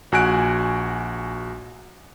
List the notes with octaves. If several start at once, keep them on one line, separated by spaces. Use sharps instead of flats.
A#1 F#4 G#5 F#6 D7